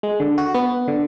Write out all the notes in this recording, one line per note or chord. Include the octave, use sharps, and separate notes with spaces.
G#3
D3
F#4
B3
D3